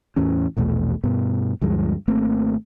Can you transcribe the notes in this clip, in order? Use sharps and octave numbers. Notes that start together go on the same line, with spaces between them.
E2 A2 E3 C#4
A#1 E2 B2 A3
G2 B2 B3
D2 G2 F3 G#3
G#1 A3 A#3 C4